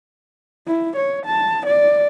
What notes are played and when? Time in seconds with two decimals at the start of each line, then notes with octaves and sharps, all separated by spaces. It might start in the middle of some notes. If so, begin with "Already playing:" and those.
0.67 E4
0.96 C#5
1.26 A5
1.66 D5